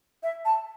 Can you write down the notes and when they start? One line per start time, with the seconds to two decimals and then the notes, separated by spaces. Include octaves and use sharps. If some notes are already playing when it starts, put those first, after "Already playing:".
0.23 E5
0.45 A5